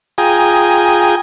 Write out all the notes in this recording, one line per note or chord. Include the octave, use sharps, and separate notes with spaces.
F4 G#4 G5 G#5 A#5 D#6